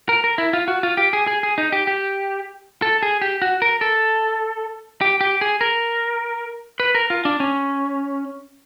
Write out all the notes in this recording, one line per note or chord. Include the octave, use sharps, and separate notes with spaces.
A#4
A#4
E4
F4
F#4
F4
G4
G#4
G#4
G#4
D#4
G4
G4
A4
G#4
G4
F#4
A#4
A4
G4
G4
G#4
A#4
B4
A#4
F4
D4
C#4